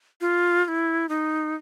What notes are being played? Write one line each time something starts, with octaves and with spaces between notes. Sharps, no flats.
F4
F4
E4
D#4